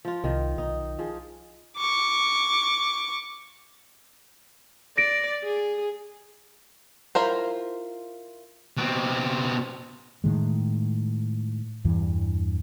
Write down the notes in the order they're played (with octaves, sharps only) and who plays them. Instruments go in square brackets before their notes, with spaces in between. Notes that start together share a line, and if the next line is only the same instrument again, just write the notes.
[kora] F3 F4
[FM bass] C2 [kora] D#3
[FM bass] B1 [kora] D#4
[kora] F3 G#4
[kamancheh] C#6 D6
[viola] D5 [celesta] A#6 D7
[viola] G#4
[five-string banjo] E4 F4 A#4 C5
[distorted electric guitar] B2 C4
[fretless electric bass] A2 D#3 G#3
E2 G2 E3